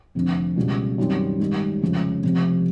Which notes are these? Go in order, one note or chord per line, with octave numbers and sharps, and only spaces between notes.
F1 F2 D3
C#2 B2 G3
F#2 D#3 G3 C4
G#2 D#3 G3
F1 F2 C#3 F3 G#3
F1 F2 C3